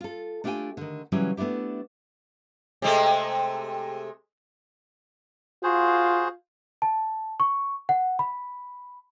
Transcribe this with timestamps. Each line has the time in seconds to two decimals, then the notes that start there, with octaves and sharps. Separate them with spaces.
0.01 F4 A4
0.44 A3 D4 F4 G4 G5 G#5
0.77 D3 D#3
1.12 C#3 E3 F#3 G3 C#4 E4
1.37 A3 B3 D4 E4 G4
2.82 C3 G#3 A3
5.63 F4 F#4 G#4 C5
6.82 A5
7.40 C#6
7.89 F#5
8.19 B5